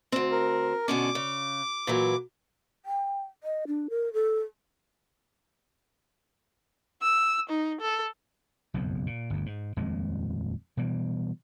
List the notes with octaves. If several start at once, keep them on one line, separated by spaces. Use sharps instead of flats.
D2 C4
A#4
B2 D3 C#4 D6
C#3
A#2 E3 F#3
G5
D#5
D4
A#4
A4
E6
D#4
A4
F#1 B1 F2 G#2
A#2
G1 D2
G#2
D#1 F2 A#2 G#3
B2 E3 G3